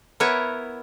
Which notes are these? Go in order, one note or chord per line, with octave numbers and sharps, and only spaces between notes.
B3 E4 A#4 C#5